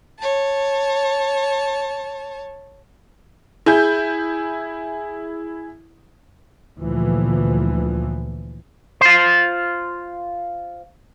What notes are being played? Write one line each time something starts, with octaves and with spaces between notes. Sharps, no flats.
C#5 A5
E4 G#4 G6
D2 A#2 E3 F3
F4 C5